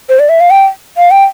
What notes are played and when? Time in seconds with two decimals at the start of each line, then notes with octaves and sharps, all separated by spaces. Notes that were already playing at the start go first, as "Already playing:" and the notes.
0.09 C5
0.19 D5
0.29 E5
0.40 F5
0.50 G5
0.97 F5
1.11 G5